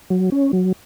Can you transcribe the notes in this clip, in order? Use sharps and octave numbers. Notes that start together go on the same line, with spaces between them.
F#3
C#4
F#3